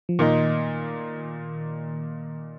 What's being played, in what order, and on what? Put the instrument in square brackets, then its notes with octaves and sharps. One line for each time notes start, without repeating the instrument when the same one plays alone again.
[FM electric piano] F3
[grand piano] A#2 A#3 D#4 [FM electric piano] D#3